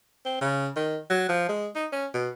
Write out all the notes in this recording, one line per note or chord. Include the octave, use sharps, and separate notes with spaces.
C4
C#3
D#3
F#3
F3
G#3
D#4
C#4
B2